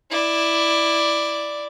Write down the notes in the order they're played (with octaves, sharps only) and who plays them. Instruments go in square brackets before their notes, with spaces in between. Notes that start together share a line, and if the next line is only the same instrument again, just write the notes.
[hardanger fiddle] E4 D5